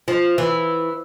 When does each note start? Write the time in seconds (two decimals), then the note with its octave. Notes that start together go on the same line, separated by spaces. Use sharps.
0.08 F3
0.38 E3